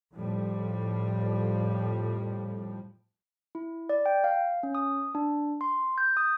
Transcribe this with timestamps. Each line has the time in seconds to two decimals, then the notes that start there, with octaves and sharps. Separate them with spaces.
0.14 F2 A2 F3 G3
3.55 E4
3.89 D5
4.06 G5
4.24 F5
4.63 C#4
4.75 D#6
5.15 D4
5.61 C6
5.98 G6
6.17 D#6